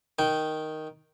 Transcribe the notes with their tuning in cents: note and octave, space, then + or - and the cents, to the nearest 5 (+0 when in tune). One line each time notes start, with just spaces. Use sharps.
D#3 +0 G5 -10